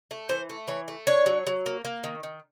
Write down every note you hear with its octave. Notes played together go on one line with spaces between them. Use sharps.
A3
E3 C5
A3
E3 C#5
A3
D4 C#5
F#3
F#3
A#3
A#3
D#3
D#3